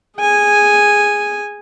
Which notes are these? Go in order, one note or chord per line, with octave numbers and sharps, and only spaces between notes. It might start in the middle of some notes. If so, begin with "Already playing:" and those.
G#4 G#5